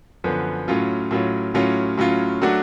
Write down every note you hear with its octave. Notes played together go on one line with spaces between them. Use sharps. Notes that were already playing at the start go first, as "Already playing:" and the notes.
F#2 D3 F3 B3
A2 F#3 C#4 F4
A2 F#3 C#4 F4
A2 F#3 C#4 F4
A2 F#3 C#4 F4
F#3 A3 D4 F#4